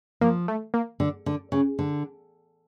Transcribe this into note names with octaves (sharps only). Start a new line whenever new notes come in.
F3 A#3
A3
A#3
D3
D3
C#3
D3